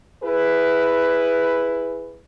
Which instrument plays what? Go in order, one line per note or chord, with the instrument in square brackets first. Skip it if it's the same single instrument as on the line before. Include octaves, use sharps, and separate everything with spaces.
[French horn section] E4 G#4 B4